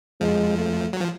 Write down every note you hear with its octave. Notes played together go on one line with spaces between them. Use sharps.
F2 F3 G#3
A3
F#3
F3